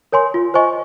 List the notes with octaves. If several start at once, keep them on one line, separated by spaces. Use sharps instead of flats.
A#4 C#5 G#5 C6
F4
C5 D#5 G#5 C#6